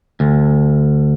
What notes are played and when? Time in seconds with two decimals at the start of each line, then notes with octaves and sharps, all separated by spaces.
0.20 D2